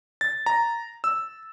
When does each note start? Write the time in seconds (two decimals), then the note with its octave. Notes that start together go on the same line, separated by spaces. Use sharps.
0.21 A6
0.46 A#5
1.04 E6